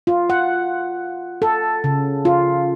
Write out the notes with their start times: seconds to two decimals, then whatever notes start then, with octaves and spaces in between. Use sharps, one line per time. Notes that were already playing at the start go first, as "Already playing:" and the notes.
0.07 F4
0.30 F#5
1.42 A4
1.84 C#3
2.25 F4